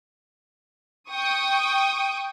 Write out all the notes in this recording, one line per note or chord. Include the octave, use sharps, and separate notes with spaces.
G5 C#6 D#6